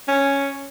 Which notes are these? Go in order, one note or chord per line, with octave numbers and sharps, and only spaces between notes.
C#4